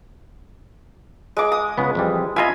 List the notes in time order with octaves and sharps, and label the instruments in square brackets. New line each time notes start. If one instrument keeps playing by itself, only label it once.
[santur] G#3 D6
D#6
[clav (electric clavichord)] C#2 C#3 B3
F2 E3 G3
[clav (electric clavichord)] E4 F4 D#5 [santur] G#5 B5